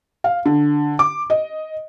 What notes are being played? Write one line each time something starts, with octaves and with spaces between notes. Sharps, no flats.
F5
D3
D6
D#5